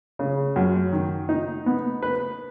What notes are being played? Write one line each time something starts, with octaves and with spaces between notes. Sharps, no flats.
C#3
F#2
D#3
D#4
B3
B4